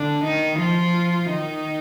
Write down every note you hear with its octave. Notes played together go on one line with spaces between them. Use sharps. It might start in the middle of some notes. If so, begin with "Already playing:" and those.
Already playing: D3 D4
D#3 D#4
F3 F4
D#3 D#4